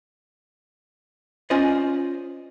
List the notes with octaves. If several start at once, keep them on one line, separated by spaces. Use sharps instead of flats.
C#4 F4 C5 D5 D#5